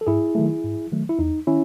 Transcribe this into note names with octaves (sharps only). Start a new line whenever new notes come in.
A4
G#2 E4 G#4
D#3 F#3 A3
G#2
D#3 F#3 A3
E4
E2 D#4
D#3 C#4 E4